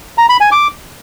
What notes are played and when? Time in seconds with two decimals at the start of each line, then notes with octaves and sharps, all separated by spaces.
0.18 A#5
0.29 B5
0.41 G#5
0.52 D6